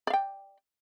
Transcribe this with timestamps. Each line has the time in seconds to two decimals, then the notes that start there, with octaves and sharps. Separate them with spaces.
0.07 D5
0.10 F5
0.13 G5